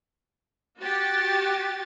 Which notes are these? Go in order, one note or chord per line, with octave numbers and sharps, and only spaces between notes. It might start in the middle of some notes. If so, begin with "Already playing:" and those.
F#4 G4 A6